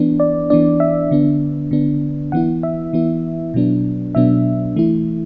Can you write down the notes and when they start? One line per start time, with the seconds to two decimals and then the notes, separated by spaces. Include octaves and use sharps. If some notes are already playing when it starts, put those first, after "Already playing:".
Already playing: E3 B3 D4
0.20 D5
0.50 E3 B3 D4 D5
0.80 E5
1.11 D3 B3 D4
1.71 D3 B3 D4
2.32 E3 B3 E4 F#5
2.63 E5
2.93 E3 B3 E4
3.54 B2 F#3 B3 D4
4.15 B2 F#3 B3 D4 E5
4.76 E3 A3 E4